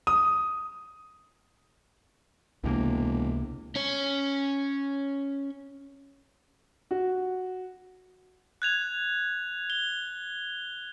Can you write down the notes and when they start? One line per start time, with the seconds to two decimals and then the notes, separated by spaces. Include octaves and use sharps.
0.07 D#6
2.64 E1 C#2 C3 A#3
3.76 C#4 C#5
6.91 F#4
8.62 F#6 G#6 F7
9.70 G7